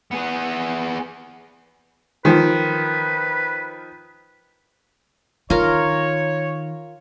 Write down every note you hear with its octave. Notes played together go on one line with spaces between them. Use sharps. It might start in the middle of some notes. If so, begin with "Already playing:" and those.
B3 G#4
D#3 F3 B4
D#3 F4 A#4 C#5